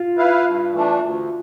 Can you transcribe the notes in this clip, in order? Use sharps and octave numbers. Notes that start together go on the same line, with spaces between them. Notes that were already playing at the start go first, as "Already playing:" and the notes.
Already playing: F4
E4 B4 F5
G2
E3 A3 D4
D2